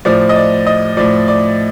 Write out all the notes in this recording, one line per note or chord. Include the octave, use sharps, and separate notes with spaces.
A2 F3 D5
D#5
D5
D#5
A2 F3 D5
D5